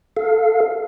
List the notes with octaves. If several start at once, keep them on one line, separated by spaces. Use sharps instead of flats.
A4 F5